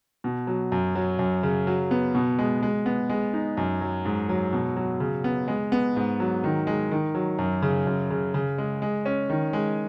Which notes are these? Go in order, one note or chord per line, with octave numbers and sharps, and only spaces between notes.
B2
F#3
F#2
F#3
F#2
C#3
F#3
B3
B2
G#3
G#3
B3
G#3
D#4
F#2
F#3
G#2
F#3
B2
F#3
C#3
B3
G#3
B3
G#2
F#3
D#3
G#3
D#3
F#3
F#2
C#3
F#2
C#3
C#3
G#3
G#3
C#4
D#3
G#3